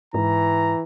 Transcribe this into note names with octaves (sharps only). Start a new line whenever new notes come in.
G#2 E3 A#5